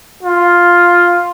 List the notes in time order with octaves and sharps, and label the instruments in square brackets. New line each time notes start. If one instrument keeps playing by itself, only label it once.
[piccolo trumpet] F4